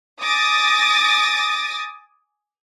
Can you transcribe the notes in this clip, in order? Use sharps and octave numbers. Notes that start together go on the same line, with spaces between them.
G#5 D6 D#6 A6 A#6